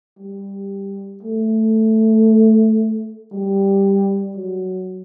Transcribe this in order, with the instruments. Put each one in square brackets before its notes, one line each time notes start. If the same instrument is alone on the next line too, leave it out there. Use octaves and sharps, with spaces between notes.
[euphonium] G3
A3
G3
F#3